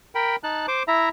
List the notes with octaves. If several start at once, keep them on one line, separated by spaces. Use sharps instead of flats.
A#4 G5 B5
D#4 A5 F#6
C5 D6
E4 E5 A#5